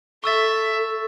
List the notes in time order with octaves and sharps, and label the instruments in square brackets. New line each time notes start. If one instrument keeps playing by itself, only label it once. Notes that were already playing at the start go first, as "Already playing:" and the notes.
[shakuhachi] A4 [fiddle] E5 [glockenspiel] C#6 E6 A6